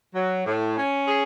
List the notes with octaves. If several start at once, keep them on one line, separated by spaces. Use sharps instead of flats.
F#3
A2
C#4
G#4